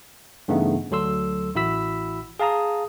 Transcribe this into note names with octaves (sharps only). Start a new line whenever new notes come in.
G2 C#3 E3 A3 B3 D#4
D2 F#3 A4 C6 E6
A1 E4 F#4 B5 E6 B6
G#4 F5 A5 A#5 D#6